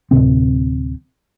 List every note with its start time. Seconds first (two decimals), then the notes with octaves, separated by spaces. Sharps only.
0.11 D1 G#1 C3 C4